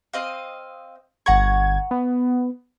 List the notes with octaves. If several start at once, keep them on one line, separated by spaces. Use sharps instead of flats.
C4 D#5 F5
G1 F#5 A#5 C#6 G#6
B3